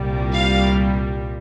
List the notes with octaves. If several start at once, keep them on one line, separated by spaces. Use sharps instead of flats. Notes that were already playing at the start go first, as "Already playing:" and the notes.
Already playing: C2 A#2 G3
F5